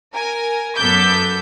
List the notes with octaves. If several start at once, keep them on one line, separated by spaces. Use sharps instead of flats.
A#4 G#5
F#2 B3 A4 D6 G6 B6